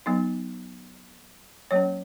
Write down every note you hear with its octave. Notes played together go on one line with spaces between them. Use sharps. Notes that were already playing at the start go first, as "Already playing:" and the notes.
F#3 B3 D#4
F#3 A#3 C#4 C#5